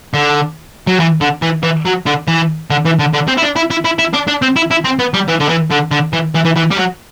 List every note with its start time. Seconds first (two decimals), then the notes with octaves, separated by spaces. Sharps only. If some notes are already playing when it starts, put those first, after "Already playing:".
0.14 D3
0.87 F#3
1.00 E3
1.21 D3
1.42 E3
1.63 E3
1.85 F#3
2.06 D3
2.28 E3
2.71 D3
2.85 E3
2.99 D3
3.13 D3
3.28 C4
3.38 E4
3.42 D4
3.56 E4
3.71 E4
3.85 E4
3.99 E4
4.14 D4
4.28 D4
4.42 C4
4.56 E4
4.71 E4
4.85 C4
4.99 B3
5.14 G3
5.28 E3
5.40 D3
5.49 E3
5.71 D3
5.91 D3
6.13 E3
6.35 E3
6.45 E3
6.56 E3
6.71 G3
6.77 F#3